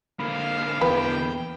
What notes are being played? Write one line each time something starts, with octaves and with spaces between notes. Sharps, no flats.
D3 A#3 F5 B5
E2 E3 B4 G5